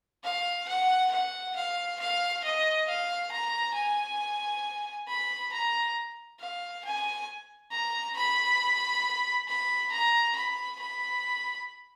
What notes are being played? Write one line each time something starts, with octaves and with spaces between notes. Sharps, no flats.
F5
F#5
F#5
F5
F5
D#5
F5
A#5
G#5
B5
A#5
F5
G#5
A#5
B5
B5
A#5
B5
B5